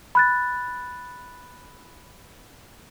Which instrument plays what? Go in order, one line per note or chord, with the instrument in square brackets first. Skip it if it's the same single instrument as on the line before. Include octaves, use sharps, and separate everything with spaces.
[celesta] B5 F#6 A6